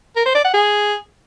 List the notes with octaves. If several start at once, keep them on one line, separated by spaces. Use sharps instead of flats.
A#4
C5
D5
F#5
G#4